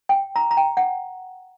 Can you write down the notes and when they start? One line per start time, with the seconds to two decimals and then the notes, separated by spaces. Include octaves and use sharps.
0.09 G5
0.36 A#5
0.51 A#5
0.57 G5
0.77 F#5